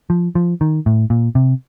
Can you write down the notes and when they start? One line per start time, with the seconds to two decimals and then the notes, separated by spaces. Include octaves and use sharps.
0.10 F3
0.35 F3
0.61 D#3
0.86 A2
1.10 A#2
1.35 C3